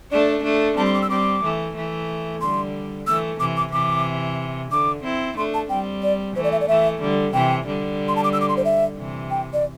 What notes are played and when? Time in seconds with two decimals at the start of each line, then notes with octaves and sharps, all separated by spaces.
0.11 A3 D4 D5
0.44 A3 D4
0.77 G3 C4 A5
0.86 C6
0.94 D6
1.02 E6
1.10 G3 C4 D6
1.43 E3 A3
1.75 E3 A3
2.41 D3 G3 C6
3.07 E3 A3 E6
3.39 C3 E3 D6
3.57 D6
3.72 C3 E3 D6
4.71 D3 D6
5.04 C4 E4
5.37 A3 D4 C6
5.54 A5
5.70 G3 C4 G5
6.03 D5
6.35 E3 A3 C5
6.44 D5
6.52 E5
6.61 D5
6.68 E3 A3 E5
7.01 D3 G3
7.34 C3 E3 G5
7.66 D3 G3
8.08 C6
8.16 A5
8.24 D6
8.33 E6
8.41 D6
8.49 C6
8.57 C5
8.65 E5
8.98 C3 E3
9.31 G5
9.53 D5